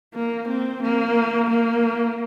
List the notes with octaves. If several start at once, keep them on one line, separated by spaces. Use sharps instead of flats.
A#3
C4
A#3
A#3